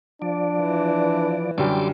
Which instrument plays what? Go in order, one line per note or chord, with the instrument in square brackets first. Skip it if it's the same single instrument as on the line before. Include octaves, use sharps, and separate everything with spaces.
[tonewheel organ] F3 D5 [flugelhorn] D4
[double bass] E3
[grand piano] F#2 D3 G4 [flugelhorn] G3 [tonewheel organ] C6 D6